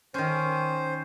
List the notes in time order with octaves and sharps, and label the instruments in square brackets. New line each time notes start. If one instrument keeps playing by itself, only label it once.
[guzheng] D#3 C#4 [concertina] C5